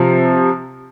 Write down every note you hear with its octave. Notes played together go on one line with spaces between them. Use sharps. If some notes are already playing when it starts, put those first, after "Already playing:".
Already playing: C3 F3